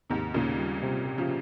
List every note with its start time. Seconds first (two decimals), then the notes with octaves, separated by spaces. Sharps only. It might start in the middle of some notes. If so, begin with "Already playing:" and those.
0.10 D#2 G#2 C3
0.34 D#2 A#2 C#3
0.58 G3
0.83 C3
1.06 G4
1.18 C#3 F3